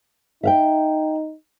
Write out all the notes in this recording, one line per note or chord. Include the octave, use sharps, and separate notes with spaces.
D#4 E5 F5 G5